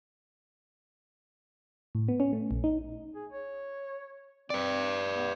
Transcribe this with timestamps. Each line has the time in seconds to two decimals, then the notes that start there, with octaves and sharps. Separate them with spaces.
1.95 A2
2.08 B3
2.20 C#4
2.33 A3
2.51 A#1
2.64 D#4
3.15 G#4
3.32 C#5
4.50 C4 B4 D5
5.16 B3